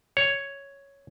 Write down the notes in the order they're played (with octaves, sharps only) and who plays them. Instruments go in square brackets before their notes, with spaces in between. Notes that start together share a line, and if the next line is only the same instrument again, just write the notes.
[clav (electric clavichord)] C#5